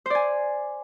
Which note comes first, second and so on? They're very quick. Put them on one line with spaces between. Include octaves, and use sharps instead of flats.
C5 D5 G#5